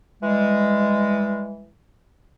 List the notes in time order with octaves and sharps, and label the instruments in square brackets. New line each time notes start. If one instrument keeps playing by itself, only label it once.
[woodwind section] E3 G3 G#3